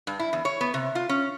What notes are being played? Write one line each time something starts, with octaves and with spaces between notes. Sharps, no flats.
G2
E4
E2
C#5
B3
C3
F4
C#4